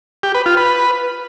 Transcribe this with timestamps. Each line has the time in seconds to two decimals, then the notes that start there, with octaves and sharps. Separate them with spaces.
0.23 G4
0.35 B4
0.46 F4
0.57 B4